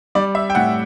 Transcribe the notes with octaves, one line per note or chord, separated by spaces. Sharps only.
G3 D5
E5
G5
A2 F#5